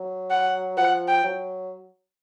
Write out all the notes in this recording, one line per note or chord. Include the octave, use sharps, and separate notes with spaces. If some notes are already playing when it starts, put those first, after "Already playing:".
Already playing: F#3
F#5
F3 F#5
G5
F#3